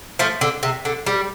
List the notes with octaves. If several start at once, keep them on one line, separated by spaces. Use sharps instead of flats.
F3 A3
D3
C3
D3
G3